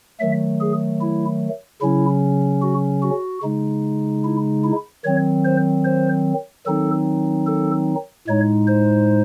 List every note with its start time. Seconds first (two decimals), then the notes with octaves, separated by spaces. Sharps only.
0.20 D#3 F#3 A3 E5
0.60 G#4
1.01 E4
1.81 C#3 F#3 C#4 E4
2.62 F#4
3.03 F#4
3.43 C#3 G#3 D#4
4.24 E4
4.64 E4
5.04 D#3 F#3 C4 C#5
5.45 C5
5.85 C5
6.66 D#3 F#3 C4 D#4 A4
7.47 A4
8.27 A2 G#3 D#4 C#5
8.67 C5